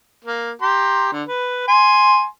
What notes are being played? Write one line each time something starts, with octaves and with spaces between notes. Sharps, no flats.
A#3
G4 A#5 C6
D3
B4
G#5 C6